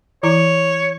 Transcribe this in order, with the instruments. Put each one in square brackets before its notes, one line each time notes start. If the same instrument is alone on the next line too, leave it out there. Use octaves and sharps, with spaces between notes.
[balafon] E3 E4 A#5 [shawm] C#5